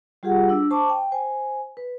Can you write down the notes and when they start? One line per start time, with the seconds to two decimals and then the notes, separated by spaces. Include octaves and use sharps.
0.23 G3 F4 G4 G#4 F#5
0.49 D4 E6
0.71 C5 A5 C#6 D6
0.89 G5
1.12 C5 G#5
1.77 B4